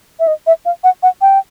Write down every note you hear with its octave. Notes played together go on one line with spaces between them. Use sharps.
E5
D#5
E5
F5
F#5
F#5
G5